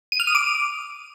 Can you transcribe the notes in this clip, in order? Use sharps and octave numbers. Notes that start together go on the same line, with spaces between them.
D#7
F6
D#6
D6